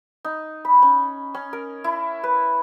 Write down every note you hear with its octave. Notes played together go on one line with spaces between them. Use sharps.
D#4
B5
C#4
C#4
A#4
E4
B4